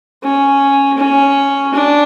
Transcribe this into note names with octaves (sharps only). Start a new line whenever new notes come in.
C#4
C#4
D4